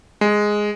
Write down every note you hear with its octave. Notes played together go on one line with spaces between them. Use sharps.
G#3